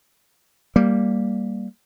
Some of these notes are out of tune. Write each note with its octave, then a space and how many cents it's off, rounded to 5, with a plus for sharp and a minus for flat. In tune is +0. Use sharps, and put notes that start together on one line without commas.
G3 +0 A#3 +0